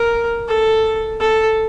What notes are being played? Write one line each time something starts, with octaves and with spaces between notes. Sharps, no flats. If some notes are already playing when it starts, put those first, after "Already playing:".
Already playing: A#4
A4
A4